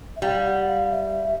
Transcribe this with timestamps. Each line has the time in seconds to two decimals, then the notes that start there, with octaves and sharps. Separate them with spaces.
0.16 E5
0.22 G3 F5
0.45 F#5
0.67 F5
0.91 E5